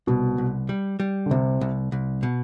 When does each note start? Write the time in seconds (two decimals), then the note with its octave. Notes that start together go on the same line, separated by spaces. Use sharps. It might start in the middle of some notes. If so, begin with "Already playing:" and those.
0.07 C2 B2
0.38 C2
0.69 G3
1.00 G3
1.26 D3
1.31 C2 C3
1.61 C2
1.92 C2
2.23 B2